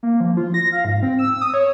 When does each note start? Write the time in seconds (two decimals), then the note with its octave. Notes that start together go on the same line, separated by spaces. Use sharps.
0.03 A#3
0.20 F3
0.37 F4
0.54 A#6
0.72 F5
0.85 G#2
1.03 C4
1.19 E6
1.41 D#6
1.54 C#5